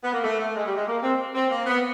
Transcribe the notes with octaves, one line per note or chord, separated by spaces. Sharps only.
B3
A#3
A3
A3
G#3
G3
G#3
A#3
C4
C4
A#3
B3